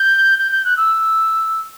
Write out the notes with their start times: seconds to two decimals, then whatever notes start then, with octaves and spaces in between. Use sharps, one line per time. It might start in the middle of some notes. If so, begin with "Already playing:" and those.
Already playing: G6
0.38 G6
0.51 G6
0.64 F#6
0.77 E6